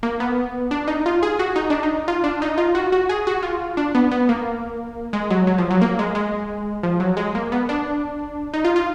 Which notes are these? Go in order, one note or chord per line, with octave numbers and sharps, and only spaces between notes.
A#3
B3
D4
D#4
F4
G#4
F#4
D#4
D4
D#4
F4
D4
D#4
F4
F#4
F#4
G#4
F#4
F4
D4
B3
B3
A#3
G#3
F#3
F#3
F3
F#3
A#3
G#3
G#3
F3
F#3
G#3
A#3
B3
D4
D#4
F4
F4